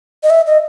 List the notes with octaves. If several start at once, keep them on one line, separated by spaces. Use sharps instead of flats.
D#5
E5
D#5